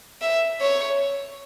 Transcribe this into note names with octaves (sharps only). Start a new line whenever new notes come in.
E5
C#5